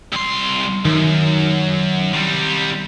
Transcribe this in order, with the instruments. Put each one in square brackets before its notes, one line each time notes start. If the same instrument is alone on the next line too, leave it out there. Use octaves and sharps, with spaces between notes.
[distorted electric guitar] C2 C6
[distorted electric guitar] F#2 [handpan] D#3
[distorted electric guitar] C3 G3